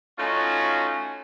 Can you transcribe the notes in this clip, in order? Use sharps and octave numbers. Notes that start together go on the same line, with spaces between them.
A3 C#4 D#4 F4 F#4